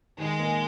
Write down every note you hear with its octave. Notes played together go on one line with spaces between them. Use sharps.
D#3 G#3
A#3